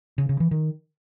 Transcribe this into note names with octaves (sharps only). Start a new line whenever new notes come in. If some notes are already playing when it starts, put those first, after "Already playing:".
C#3
C#3
E3
D#3